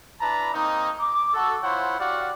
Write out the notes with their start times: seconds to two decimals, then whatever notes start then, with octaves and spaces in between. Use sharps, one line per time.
0.21 D4 E4 B4 A5 A#5
0.54 A#3 C4 D#4
1.00 D6
1.34 F#4 A4
1.63 E4 F4 C5 C#5 F#5
2.00 F#4 G4 D5 F5 F#5